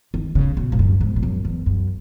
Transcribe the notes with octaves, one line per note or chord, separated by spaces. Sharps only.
D#3
C#3
B2
G#2
F#2
G#2
G#2
F#2
E2
F#2